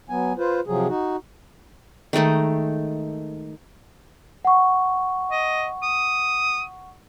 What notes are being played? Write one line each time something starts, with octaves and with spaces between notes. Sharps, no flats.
F#3 B3 G#5
F4 B4 C5
C3 F3 F#3 G#4
D#4 F#4
D#3 G#3 A3 D#4
F#5 C#6
D#5
D#6